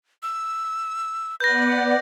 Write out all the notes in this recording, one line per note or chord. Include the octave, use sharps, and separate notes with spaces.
E6
B3 B4 D5 F#5 G6 A#6